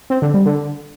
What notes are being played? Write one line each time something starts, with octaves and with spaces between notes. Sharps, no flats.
C4
D3
G3
D3